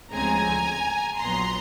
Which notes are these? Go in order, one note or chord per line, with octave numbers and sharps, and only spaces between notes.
D2 C#3 F3 G#3 C4 G#5 A#5
A#1 A#2 F#3 B3 A#5 C6